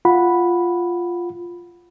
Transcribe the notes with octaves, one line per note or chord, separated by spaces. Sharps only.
F4 F#5 B5